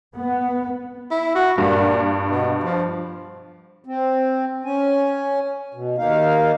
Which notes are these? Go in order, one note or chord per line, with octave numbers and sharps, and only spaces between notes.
B3
E4
F#4
G2 A#2
B2
F3
C4
C#4 G#5
B2
D#2 A#3 D#4 F5